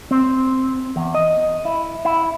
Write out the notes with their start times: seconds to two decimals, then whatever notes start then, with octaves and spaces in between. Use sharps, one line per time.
0.11 C4
0.96 E2
1.15 D#5
1.65 E4
2.05 E4